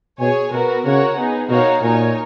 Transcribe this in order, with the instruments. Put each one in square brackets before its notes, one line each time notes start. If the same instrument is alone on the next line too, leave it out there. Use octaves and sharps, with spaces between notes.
[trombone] B2 [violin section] G#4 C#5 G#5
[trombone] B2 [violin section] B3 F#4 A#4
[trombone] C#3 [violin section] F#4 A#4 C#5 F#5
[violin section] B3 D#4 G#4
[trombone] B2 [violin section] D#4 F#4 A#4 C#5 F5
[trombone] A#2 [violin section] D#4 A#4 C#5 G#5